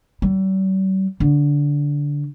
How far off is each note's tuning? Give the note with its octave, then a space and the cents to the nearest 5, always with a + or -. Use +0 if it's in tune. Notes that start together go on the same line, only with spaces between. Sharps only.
G3 -45
D3 -15